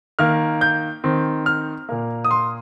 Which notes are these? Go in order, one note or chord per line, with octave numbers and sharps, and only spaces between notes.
D#3 A#3 F6
G6
D#3 C4
F6
A#2 A#3
D#6
C6